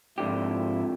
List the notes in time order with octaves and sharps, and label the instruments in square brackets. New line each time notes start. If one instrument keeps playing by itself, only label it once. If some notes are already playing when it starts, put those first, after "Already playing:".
[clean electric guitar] F2 D3 G4 [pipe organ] G#2 F3 E4